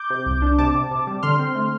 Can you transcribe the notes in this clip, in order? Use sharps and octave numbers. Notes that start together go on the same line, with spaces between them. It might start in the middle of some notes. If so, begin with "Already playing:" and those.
Already playing: D6 G6
C3
C2
D4
C3 A5 D6
C3
C3
G3
D3 C6 F6
C4
A3